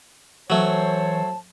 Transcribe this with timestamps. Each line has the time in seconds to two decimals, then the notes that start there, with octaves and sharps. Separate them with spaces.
0.50 E3 F#3 A3 C5 C#5 A5